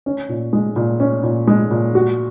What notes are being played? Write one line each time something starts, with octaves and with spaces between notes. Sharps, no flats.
C#4
A#2
G#3
A#2
C#4
A#2
G#3
A#2
F#4